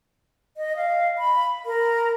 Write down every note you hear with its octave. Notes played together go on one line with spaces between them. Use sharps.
D#5
F5
B5
A#4